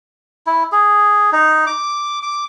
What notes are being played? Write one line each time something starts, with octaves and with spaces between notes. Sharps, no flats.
E4
G#4
D#4
D6
D6